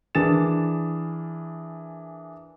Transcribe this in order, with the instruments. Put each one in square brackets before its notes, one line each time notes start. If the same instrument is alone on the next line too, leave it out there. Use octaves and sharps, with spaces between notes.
[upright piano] E3 D4 G#4 A#4 A6 E7